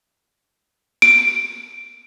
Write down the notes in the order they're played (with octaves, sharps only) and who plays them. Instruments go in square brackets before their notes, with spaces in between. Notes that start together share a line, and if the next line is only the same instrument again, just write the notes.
[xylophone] D7